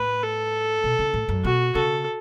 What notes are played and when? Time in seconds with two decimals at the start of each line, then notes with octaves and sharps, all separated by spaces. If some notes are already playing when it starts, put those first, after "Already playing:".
Already playing: A2 B4
0.22 A4
0.84 B2
0.99 C#3
1.14 A2
1.29 F#2
1.44 B2 F#4
1.75 C#3 A4